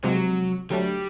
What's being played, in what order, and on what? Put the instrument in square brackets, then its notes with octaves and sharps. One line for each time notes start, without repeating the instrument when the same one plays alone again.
[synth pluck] C3 F3 G#3 [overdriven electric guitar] F#3
[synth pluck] D3 F#3 A3 D4 [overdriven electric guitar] G3